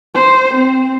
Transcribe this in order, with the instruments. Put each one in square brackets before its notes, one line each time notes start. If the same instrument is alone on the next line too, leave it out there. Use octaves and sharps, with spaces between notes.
[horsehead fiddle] C5
C4